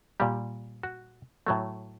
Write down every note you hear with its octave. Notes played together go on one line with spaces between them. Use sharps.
A#2 G3 G4
F#4
A2 F#3 A3